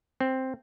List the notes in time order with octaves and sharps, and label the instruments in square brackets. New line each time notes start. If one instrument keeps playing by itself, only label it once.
[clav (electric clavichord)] C4